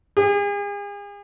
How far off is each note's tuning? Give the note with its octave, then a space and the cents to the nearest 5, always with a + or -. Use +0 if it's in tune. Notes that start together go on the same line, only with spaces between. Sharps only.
G#4 -40